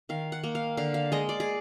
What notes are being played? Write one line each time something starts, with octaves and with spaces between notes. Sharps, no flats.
D#3 F5
F#5
A#3
F5
D3 F5
F5
G#3 D#5
D5
G#4